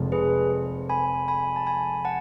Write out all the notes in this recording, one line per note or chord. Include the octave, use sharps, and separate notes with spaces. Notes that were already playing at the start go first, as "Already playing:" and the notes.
Already playing: F1 F2 F3 G#3
G#4 B4
G#5 B5
G#5 B5
A5
G#5 B5
F#5 A5